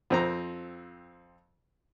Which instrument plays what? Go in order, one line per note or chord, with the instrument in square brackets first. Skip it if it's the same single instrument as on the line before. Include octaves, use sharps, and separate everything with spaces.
[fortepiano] F2 C4 A#5